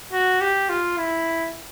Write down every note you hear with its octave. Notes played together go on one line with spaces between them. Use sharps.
F#4
G4
F4
E4